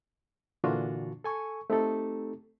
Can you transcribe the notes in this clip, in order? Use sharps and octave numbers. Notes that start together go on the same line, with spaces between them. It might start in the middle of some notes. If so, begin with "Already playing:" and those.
A#2 D3 E3 D4 F4 F#4
A4 G#5 C#6
A3 C4 D#4 G4 A4